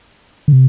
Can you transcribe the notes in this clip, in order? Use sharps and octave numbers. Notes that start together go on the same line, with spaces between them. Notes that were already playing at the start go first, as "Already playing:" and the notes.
D3
C3